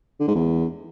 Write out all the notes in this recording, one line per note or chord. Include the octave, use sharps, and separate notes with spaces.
D3
G#2
E2